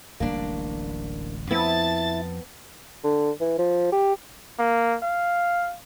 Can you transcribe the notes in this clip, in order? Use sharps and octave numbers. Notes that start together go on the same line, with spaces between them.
D1 A1 G3 A#3 D4
F2 B3 C4 E4 A5 A6
D3
E3
F3
G4
A#3
F5